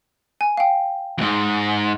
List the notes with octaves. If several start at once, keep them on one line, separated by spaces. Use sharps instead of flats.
G#5
F5 G5
F2 G#2